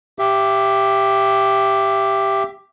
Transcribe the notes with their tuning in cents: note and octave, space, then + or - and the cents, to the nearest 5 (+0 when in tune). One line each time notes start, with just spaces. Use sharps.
G4 +0 E5 +25